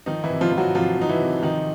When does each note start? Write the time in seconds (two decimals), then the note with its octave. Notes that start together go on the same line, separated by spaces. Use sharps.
0.06 D#3 F3 D#4
0.24 E3 E4
0.30 C3
0.41 F3 F4
0.52 F3
0.58 F#3 F#4
0.75 C3 F3 F4
0.98 F3 D#4
1.09 E3 E4
1.20 C3
1.42 D#3 F3 D#4